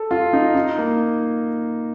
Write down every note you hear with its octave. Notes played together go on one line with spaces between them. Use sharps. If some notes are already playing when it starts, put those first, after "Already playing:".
Already playing: A4
F4
D#4
D#4
A#3